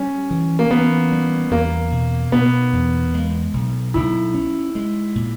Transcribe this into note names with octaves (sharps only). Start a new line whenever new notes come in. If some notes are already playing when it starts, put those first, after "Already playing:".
Already playing: G3 C#4
E3
A#3
E3 B3
G3
E2 A#3
B2
B2 B3
E2
G#3
B1
B1 E4
C#4
G#3
A#2